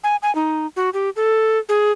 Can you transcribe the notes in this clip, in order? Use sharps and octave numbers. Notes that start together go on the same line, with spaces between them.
G#5
G#5
D#4
F#4
G4
A4
G#4